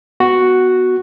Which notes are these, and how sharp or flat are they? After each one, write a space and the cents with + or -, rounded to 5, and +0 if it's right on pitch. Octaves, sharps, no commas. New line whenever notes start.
B3 +0 F#4 +0